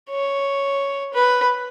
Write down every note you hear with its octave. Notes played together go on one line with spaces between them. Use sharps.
C#5
B4